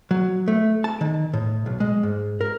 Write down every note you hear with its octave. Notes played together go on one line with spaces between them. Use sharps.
F#3
A3
A5
D#3
A2
B1
G#3
G#2
A#4